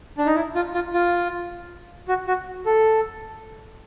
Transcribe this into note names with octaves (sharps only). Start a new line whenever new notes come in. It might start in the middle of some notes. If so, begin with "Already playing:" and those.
D4
D#4
E4
F4
F4
F4
F#4
F#4
A4